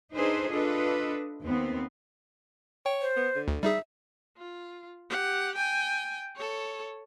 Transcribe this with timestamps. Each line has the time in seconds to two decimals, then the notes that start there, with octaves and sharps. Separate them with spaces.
0.14 D4 D#4 G#4 A4 B4 C5
0.49 D4 F4 A4 B4 D#5
1.43 D#2 B3 C4
2.86 C#5 G5
3.02 C5
3.17 B3
3.35 D3
3.48 D2
3.63 G3 D#4 G#4 E5
4.37 F4
5.09 G4 F#5
5.55 G5 G#5
6.36 A4 C#5